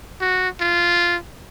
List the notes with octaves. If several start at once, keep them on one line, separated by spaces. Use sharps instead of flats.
F#4
F4